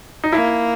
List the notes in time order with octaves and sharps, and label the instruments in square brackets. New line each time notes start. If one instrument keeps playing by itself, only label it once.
[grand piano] D#4
[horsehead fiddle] A#3 [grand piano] E4